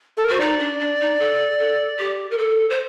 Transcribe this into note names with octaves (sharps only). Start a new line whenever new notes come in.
A4
A#4
F#4 C5
D#4 D5
D4
D4
D#4
A4
A4
G4
A#4
A4
C5